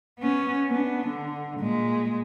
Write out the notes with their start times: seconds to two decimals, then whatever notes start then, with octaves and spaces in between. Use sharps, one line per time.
0.19 B3 C#4
0.67 B3 D4
1.07 D3
1.60 A#2 G#3